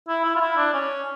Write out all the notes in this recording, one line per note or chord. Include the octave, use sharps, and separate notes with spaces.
E4
E4
F4
E4
D4
C#4